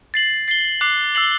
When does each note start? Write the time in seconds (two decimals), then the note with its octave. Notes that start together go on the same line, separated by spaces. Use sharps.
0.14 A6 C7 F#7
0.48 A6 C7 G7
0.81 D6 F#6 C7
1.15 E6 A6 C7 F#7